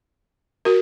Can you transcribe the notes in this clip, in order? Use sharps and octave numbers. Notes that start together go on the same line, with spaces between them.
F#4 A#4